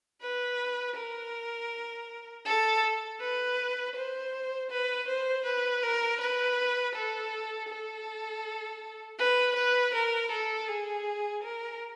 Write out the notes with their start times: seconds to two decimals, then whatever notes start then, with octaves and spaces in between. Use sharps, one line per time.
0.22 B4
0.97 A#4
2.45 A4
3.21 B4
3.96 C5
4.71 B4
5.08 C5
5.46 B4
5.83 A#4
6.21 B4
6.95 A4
7.69 A4
9.19 B4
9.56 B4
9.94 A#4
10.31 A4
10.68 G#4
11.43 A#4